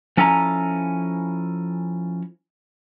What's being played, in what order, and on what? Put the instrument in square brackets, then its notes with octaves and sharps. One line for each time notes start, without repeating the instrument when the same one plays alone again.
[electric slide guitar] F3 C#4 E4 A4 G#5 A#5